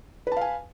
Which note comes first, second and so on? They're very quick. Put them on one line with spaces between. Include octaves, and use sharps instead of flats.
B4 A5 F5 G#5